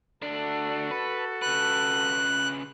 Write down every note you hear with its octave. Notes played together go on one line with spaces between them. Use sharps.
D2 D4 F#4 A4
B4
C#3 B4 F#6